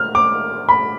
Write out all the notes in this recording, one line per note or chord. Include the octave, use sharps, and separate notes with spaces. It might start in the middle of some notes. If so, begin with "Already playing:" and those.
Already playing: F6
D6
B5